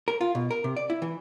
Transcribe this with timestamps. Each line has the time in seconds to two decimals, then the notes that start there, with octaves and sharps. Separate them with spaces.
0.08 A#4
0.21 F4
0.35 B2
0.51 A#4
0.64 C3
0.76 D5
0.90 E4
1.02 E3